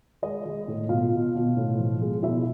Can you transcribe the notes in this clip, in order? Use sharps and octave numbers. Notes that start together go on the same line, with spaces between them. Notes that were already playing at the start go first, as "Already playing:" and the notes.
G#3 D#5
G#3
A2
B2 F4 F5
B2
B2
A2
F3
G#3
B2 E4 E5